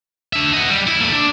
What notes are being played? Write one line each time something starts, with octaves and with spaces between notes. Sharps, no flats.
D4 E5
D#5 F#5
G3
E4
A#3 A4
D4